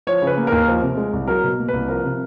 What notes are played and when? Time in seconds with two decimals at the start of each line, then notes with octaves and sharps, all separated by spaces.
0.07 F3 C#5
0.22 C#3
0.27 B4
0.37 A#3
0.47 D#2 A#4
0.68 F3
0.82 C3
0.97 G#3
1.13 C2
1.28 F#3 A#4
1.44 B2
1.59 A#3
1.69 C2 B4
1.88 F3 A#4
2.04 C3